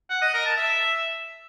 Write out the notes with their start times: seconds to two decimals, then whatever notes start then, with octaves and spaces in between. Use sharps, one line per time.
0.10 F#5
0.21 D#5
0.33 A#4
0.45 A5
0.57 E5